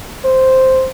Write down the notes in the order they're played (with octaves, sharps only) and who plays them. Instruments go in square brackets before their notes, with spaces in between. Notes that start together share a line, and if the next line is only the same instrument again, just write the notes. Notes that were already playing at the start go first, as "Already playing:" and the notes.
[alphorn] C5